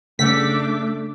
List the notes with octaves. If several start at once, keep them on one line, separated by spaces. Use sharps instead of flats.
C#3 G3 A3 D4 D6 B6